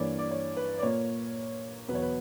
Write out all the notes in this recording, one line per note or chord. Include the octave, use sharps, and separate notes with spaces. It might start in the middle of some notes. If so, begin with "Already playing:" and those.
Already playing: G2 E3 A#3 C#5 D5
D5
C#5
B4
D5
A#2 A#3 C#5
E2 B2 F#3 B3 B4
C#5
B4